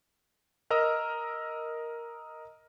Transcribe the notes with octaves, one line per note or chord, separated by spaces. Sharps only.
A#4 D#5 A#5 E6 F6